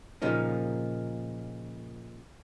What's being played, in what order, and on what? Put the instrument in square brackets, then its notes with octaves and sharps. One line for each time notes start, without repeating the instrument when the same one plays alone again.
[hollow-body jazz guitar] A#2 C#3 F3 A#3 D#4